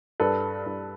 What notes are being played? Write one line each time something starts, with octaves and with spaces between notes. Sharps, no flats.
G2 A4 B4
G2